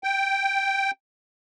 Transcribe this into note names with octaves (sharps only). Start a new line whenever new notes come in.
G5